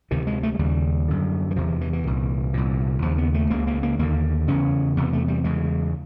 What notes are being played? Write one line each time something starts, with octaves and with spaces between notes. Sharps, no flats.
D2 C3 D#3
G#3
A3
G#3
D#2 C#3 G3
F#2 D3
E3
E2 C3 F3
E3
E3
E3
C2 A#2
C2 A#2
D#2 C#3 F3
B3
A3
C#2 C#3 A#3
A#3
A#3
D#2 D3 A#3
E2 C#3 C#4
E2 C3 B3
A3
G3
E2 C#3 G#3